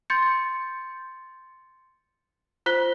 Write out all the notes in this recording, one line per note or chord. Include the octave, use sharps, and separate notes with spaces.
C6 G6 A6 C#7
F4 C5 F#6 B6 G7